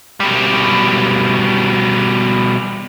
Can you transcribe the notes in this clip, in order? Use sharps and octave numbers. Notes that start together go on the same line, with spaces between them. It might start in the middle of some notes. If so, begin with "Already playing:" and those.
B2 G3